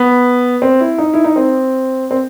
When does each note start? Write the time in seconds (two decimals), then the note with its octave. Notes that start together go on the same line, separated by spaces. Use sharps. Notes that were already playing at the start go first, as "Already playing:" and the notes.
Already playing: B3
0.62 C4
0.81 E4
0.98 D#4
1.14 E4
1.24 D#4
1.36 C4
2.11 C4